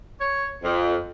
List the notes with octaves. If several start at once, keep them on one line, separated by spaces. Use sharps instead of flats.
C#5
F2